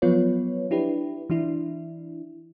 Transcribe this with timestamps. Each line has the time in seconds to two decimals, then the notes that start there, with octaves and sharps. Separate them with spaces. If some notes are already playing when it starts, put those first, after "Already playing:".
0.02 F3 F#3 B3 F4 B4 C#5
0.71 D4 E4 G4 B4
1.30 E3 D4 E4